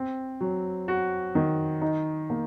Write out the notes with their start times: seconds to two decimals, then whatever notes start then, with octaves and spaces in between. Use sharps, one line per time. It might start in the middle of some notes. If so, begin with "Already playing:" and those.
Already playing: C4
0.40 F#3
0.88 F#4
1.35 D#3
1.81 D#4
2.30 A#3